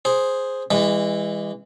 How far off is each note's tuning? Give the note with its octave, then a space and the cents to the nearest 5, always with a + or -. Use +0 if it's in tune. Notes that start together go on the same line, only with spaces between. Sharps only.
G#4 +0 C5 +0
E3 +0 G#3 -35